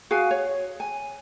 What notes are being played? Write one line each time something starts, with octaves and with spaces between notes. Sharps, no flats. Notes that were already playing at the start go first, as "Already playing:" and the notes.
F#4 G#4 F5 G#5
C#5
G#5